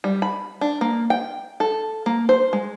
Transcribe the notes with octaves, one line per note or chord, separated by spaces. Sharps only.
G3
B5
D4
A#3
G5
A4
A#3
C5
G#3